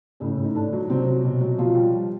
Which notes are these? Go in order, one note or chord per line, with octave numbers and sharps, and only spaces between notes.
A2 C#3 C#4
A2
D#4
A2 D3 D4
F#3
C3 F#3 C4
F#3
B2
F#3
B2 F3 F4
G3
G3